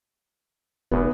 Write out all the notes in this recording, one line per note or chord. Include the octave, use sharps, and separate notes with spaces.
F1 B3